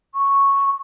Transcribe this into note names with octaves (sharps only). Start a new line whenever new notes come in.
C#6